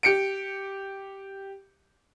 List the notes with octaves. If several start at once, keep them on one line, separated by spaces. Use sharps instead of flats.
G4 C#7 D7